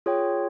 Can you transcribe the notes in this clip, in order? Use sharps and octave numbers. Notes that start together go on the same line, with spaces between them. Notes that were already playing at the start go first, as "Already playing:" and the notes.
F4 G#4 C#5 G5